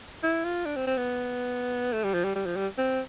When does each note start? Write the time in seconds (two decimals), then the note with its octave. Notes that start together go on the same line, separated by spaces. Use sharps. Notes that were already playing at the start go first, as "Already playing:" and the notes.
0.23 E4
0.45 F4
0.66 D4
0.76 C4
0.87 C4
0.98 B3
1.93 A3
2.04 G3
2.14 F3
2.25 G3
2.35 G3
2.46 F3
2.56 G3
2.78 C4